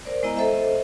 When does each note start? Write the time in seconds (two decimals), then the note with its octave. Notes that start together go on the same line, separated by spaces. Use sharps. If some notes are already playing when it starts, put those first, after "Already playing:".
0.05 A#4 C5 D5
0.23 G#3 B3 E4 D#5 A#5
0.37 A4 C5 D#5 E5